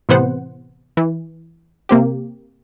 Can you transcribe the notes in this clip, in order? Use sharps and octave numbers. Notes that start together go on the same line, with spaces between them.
A2 C3 E3 B3 C5 F#5
E3
C3 A#3 C4 G4